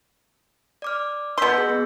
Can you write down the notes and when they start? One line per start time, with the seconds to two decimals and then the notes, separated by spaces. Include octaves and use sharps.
0.82 D5 D6 F6
1.38 B2 C6 E6 G6 B6
1.58 G#4
1.70 B3